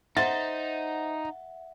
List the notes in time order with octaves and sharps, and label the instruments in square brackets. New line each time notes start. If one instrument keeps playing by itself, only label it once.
[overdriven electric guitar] D#4 [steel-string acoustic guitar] C5 [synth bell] E5 F#5 [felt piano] A6